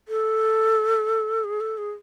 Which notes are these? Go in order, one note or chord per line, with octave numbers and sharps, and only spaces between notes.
A4
G#4
A4
G#4